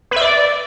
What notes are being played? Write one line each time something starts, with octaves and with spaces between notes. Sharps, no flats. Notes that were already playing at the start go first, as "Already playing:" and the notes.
B4
E5
D5